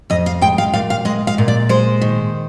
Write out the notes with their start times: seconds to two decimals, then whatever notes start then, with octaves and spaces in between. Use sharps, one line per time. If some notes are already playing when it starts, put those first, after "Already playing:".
0.10 F2 D#5
0.26 F5
0.41 G#3 G5
0.58 F5
0.74 A#2 F5
0.90 F5
1.05 G#3 D#5
1.27 F5
1.38 A#2
1.48 D5
1.69 G#3 C5
2.01 D#3